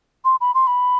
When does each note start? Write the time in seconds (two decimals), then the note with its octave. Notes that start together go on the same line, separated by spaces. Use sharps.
0.25 C6
0.41 B5
0.54 C6
0.67 B5